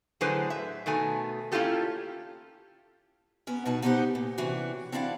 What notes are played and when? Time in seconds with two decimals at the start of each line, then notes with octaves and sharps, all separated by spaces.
0.21 A2 D3 F#3 G#4 B4 C5
0.50 E5
0.86 B2 D#3 A3 G#5
1.52 A#3 C#4 E4 F4 G4 A4
3.47 B3 C#4 A#4
3.65 B2 D#4 F#4 A5
3.82 B3 D#4 G4 C5 E5 F#5
4.15 A#2
4.38 C3 E3 C#4 D4 F#4
4.92 C4 D4 E4 D5 F5 F#5